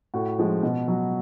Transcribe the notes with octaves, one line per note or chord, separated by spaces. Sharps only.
A2 F#4
F3 G#3
B2
F#3